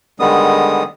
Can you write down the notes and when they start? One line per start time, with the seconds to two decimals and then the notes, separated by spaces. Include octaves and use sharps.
0.20 D3 D#3 G3 G#3 B3 D#6